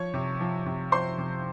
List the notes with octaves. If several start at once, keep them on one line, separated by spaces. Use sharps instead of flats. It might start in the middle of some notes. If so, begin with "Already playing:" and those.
Already playing: F3 C#5 C#6
C3
F3
C3
F3 C5 C6
C3